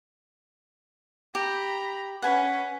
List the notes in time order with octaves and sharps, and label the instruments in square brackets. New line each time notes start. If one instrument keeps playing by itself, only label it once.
[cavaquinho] G4 [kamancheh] A#5 B5
[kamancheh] C#4 B4 [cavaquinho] F#5 G#5